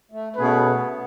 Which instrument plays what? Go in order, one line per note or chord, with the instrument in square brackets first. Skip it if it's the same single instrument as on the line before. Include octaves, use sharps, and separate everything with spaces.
[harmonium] A3
[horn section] B2 A3 C#4 G#4 B4 [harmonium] B3